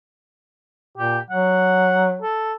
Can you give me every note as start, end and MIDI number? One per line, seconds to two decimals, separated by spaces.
0.98 1.19 46
0.98 1.19 67
1.30 2.19 54
1.30 2.15 78
2.22 2.54 69